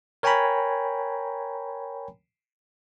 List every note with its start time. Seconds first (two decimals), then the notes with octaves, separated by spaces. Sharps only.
0.23 A#4 C#5 G5 G#5 A#5 B5